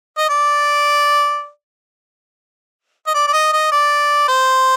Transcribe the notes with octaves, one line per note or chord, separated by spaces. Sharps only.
D#5
D5
D#5
D5
D5
D#5
D#5
D5
C5